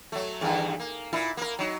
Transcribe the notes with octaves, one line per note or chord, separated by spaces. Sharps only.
F#3 A3
E2 G2 D#3
A#3
A#2 E4
A#3 A#4
F#3 D#4